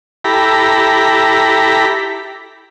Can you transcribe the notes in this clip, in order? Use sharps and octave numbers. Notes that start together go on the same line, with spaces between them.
E4 G4 A4 A#5 B5